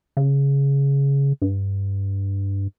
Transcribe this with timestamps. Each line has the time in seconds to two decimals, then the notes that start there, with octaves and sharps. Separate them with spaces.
0.17 C#3
1.42 G2